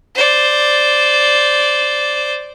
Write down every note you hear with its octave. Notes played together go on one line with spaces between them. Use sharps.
C5 D5